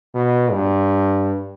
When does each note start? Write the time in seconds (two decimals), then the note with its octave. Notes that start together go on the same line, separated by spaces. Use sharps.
0.14 B2
0.52 G2